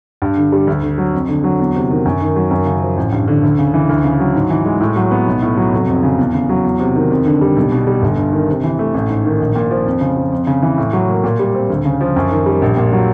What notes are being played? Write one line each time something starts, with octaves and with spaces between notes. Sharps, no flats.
G2
D3
G3
D2
D3
F#3
F2
D3
F#3
E2
C3
D#3
F#2
D#3
F#3
F#2
C#3
F3
A1
G2
D3
D2
C#3
E3
D2
C#3
F#3
G#2
E3
G#3
A2
F#3
B3
B1
A2
F#3
F1
F2
C#3
E2
C#3
F#3
E2
C3
D#3
F2
D3
G3
B1
B2
G3
G1
G2
D#3
C3
E3
A3
A1
G#2
D#3
A#1
A#2
F3
F2
C#3
F3
F2
C#3
E3
A2
F#3
A#3
A#2
G3
C4
D2
C#3
F3
F#2
D#3
G3
A#1
A#2
F#3